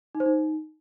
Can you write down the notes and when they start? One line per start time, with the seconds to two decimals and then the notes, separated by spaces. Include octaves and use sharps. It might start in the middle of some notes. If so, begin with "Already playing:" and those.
0.15 D#4
0.20 C5
0.26 D#4